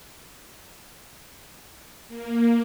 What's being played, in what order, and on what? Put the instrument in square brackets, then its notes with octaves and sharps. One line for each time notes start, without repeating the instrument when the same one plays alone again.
[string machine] A#3